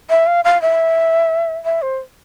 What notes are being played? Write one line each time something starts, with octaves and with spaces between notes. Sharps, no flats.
E5
F5
F5
E5
E5
C5